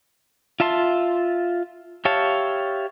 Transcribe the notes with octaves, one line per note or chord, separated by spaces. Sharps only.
F4 E5 A5 C6
G4 C#5 E5 F5 A5